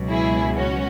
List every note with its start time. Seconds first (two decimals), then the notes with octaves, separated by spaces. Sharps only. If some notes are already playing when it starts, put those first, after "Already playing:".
Already playing: C#2 B2 F#3
0.10 E4 G#4
0.54 C#4 F#4